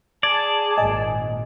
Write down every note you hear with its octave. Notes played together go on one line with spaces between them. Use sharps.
G#4 D5 A5 G#6
G#1 A#2 D#5 G#5